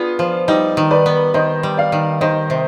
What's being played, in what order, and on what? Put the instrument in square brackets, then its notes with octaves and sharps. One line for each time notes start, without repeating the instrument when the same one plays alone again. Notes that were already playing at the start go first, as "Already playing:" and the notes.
Already playing: [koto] B3 G#4 [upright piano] D4 F4
[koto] F3
[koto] G3 [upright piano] D#4
[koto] D#3
[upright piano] B4 D5
[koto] B3
[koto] D#3 [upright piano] C5 D#5
[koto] G3
[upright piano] D5 F5
[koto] D#3
[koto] D#3 [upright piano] C5 D#5
[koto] C3